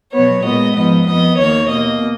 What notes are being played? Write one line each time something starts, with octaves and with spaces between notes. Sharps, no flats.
B2 F#3 B3 C#5
A#2 G#3 B3 D#5
G#2 F3 B3 D#5
F2 F3 B3 D#5
D#2 D#3 A#3 C#5
B2 A#3 D#5